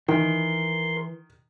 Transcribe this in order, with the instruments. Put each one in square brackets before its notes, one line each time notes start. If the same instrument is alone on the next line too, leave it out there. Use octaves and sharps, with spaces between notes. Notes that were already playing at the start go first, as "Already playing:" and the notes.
[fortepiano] D#3 [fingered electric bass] E3 [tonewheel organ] A#4 C6